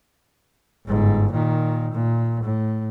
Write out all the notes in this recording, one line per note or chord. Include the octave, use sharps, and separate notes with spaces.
G1 G#2
A#2 D#3
A#2
A2